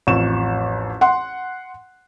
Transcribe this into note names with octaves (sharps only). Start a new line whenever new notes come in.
A1 F2 C#6 E7
F#5 C6